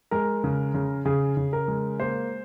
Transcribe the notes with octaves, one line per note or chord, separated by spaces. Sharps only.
G#3 A#4
C#3
C#3
C#3 G#4
C#3
A#4
G#3
A#3 C5